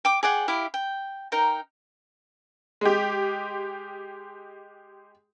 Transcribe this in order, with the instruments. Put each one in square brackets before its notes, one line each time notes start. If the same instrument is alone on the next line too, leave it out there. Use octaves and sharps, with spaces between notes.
[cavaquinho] G5 D6
G#4 D5 F#5 G5
E4 G4 F5
G5
D#4 A#4 G5
[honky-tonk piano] G#3 G4